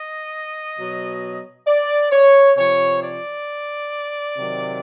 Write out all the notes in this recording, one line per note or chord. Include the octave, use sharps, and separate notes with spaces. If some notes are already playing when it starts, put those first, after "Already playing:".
Already playing: D#5
B2 F#3
D5
C#5
C3 F3 C#5
D5
C3 D#3 F#3